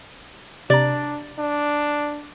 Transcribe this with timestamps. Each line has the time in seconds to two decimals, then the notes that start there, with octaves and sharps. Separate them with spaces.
0.70 C3 D4 D5 A#5
1.39 D4